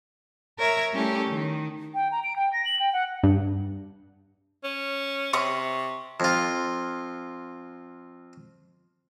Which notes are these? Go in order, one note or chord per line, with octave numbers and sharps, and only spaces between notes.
A#4 C#5 E5 A#5
G3 A3 C#4 E4 G4 A4
D#3
G5
A#5
D7
G5
A#6
F#7
G5
F#5
G2
C#4
C3 C#6 D#6
F2 F4